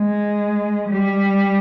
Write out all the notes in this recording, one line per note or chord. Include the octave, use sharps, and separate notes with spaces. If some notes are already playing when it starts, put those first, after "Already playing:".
Already playing: G#3
G3